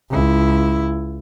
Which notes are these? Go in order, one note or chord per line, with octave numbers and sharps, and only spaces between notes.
C#2 E4